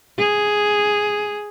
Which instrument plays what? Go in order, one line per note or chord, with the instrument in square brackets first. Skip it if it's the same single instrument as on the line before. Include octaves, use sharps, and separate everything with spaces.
[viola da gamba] G#4